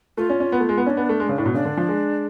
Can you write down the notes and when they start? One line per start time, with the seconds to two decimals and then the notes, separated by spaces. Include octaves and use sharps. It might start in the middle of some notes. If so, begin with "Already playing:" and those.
0.17 A3 F4
0.30 C#4
0.40 C#4
0.52 B3
0.60 A3
0.69 G#3
0.77 B3
0.86 C#4 F4
0.90 D4
0.97 B3
1.09 A3
1.20 G#3
1.29 C#3
1.38 A2
1.46 B2
1.54 C#3 D4
1.65 D3
1.77 F3
1.88 G#3